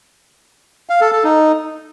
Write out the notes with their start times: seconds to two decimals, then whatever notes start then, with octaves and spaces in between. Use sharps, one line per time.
0.90 F5
1.01 A4
1.13 A4
1.24 D#4